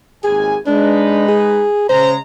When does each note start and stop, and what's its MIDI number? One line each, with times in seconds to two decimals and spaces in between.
0.24 0.55 32
0.24 0.55 39
0.24 0.58 68
0.24 0.55 80
0.67 1.65 56
0.67 1.27 62
0.67 1.65 63
0.67 1.65 71
1.28 1.86 68
1.89 2.17 49
1.89 2.17 56
1.89 2.12 72
1.89 2.17 82